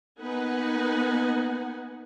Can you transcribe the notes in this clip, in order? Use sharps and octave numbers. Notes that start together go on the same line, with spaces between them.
A#3 B3 D#4 B4 F#5 G#5